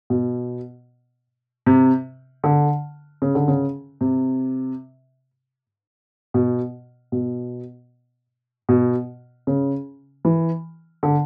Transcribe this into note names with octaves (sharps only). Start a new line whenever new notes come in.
B2
C3
D3
C#3
D3
C#3
C3
B2
B2
B2
C#3
E3
D3